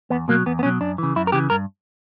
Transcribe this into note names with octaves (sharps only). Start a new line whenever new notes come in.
E2 B3
B2 F#3 A#3
E2 B3
B3
B2 F#3 C#4
F#2 D4
C#3 E3
F#2 E4
A#4
C#3 E3 G4
G2 A#4